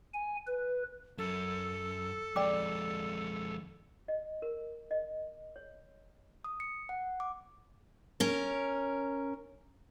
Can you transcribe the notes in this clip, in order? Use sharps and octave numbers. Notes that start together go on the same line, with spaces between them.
G#5
B4
F#2 A4
F2 G#3 D5 G5 D6
D#5
A#4
D#5
C#5
D#6
C#7
F#5
D6
C#4 A#4